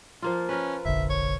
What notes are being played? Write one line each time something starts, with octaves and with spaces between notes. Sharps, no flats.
F3 A#3 F4
C#4 A#4 B4
F1 A#1 D3 E5
C#5